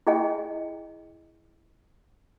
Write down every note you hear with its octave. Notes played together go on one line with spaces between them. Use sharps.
E4 G#4 D#5 G5 G#5